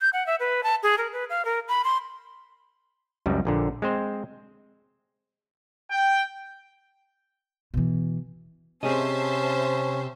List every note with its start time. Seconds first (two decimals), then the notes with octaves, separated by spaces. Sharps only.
0.01 G6
0.13 F#5
0.27 E5
0.40 B4
0.64 A5
0.83 G#4
0.98 A#4
1.13 B4
1.30 F5
1.45 A#4
1.68 B5
1.84 C6
3.26 C#2 F#2 G3
3.45 A#1 A#2 D3
3.82 G#3 C4 C5
5.91 G5
7.74 B2 E3
8.83 C3 C4 C#4 G#4 C5 D#5 E5 A5